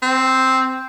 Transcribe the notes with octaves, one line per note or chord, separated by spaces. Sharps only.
C4